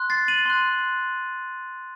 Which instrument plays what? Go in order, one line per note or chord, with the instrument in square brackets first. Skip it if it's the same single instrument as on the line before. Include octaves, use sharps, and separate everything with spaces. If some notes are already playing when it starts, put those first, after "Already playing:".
Already playing: [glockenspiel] C6 F#6
A6 C7
D#7 F#7
C6 F#6